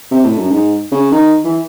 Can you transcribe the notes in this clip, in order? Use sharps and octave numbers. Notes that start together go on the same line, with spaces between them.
C3
A2
F#2
G#2
C#3
D#3
E3